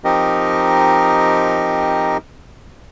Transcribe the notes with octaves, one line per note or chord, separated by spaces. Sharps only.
F3 C4 D#4 G4 A#4 D#5